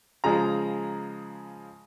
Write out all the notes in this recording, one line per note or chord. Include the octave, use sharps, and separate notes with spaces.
C#3 F3 G#3 A#5